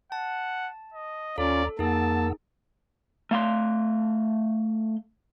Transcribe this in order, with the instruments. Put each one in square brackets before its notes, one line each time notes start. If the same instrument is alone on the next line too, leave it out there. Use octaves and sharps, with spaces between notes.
[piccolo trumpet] F#5 [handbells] A5
[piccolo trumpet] D#5
[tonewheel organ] D#2 A#5 [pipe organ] C#4 F4 [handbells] A4 [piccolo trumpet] D5
[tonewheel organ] F2 F#5 E6 [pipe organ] A#3 [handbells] D#4 G#4 [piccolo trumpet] A5
[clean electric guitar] A3 F5 C6